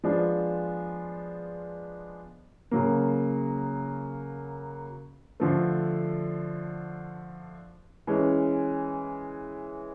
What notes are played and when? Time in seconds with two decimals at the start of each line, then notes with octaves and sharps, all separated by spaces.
0.04 F3 G#3 B3 D4 F4
2.71 C#3 F#3 A#3
5.40 D3 F3 A3
8.07 E3 G#3 C#4